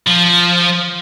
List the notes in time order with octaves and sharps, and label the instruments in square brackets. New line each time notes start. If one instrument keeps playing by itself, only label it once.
[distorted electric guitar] F3